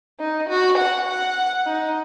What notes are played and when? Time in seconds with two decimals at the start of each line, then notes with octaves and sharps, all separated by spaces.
0.20 D#4
0.49 F#4
0.78 F#5
1.08 F#5
1.66 D#4